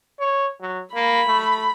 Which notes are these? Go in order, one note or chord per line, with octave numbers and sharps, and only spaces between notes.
C#5
F#3
A#3 B5
A3